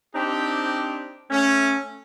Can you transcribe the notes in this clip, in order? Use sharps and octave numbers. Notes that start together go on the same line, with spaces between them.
C4 D4 D#4 G4
A3 C#4